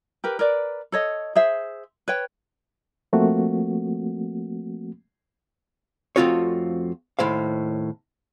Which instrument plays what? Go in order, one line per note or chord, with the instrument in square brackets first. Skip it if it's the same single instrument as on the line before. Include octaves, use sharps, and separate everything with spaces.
[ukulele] G4 A#4 B4
A#4 B4 D5
A4 C#5 D#5
G#4 C5 E5
B4 C#5 G5
[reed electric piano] F3 A3 A#3 C4 F#4
[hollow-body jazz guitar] F2 A3 C4 F4 F#4 C#5
D#2 A2 C5 F5